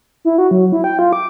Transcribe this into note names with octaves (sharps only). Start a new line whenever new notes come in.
E4
F#4
F#3
E4
G5
F4
D6